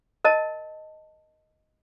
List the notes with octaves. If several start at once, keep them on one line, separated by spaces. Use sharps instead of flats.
A#4 D#5 A5